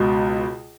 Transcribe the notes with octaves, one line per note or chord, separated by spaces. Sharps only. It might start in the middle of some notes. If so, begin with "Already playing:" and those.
Already playing: C#2 B2